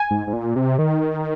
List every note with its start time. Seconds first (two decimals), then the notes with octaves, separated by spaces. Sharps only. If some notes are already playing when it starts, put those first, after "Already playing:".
Already playing: G#5
0.11 G#2
0.27 G#2
0.33 A#2
0.56 C3
0.79 D#3